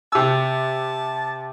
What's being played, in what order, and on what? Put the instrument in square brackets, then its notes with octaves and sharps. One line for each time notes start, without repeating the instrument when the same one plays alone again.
[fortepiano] C3 E6 [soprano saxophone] A5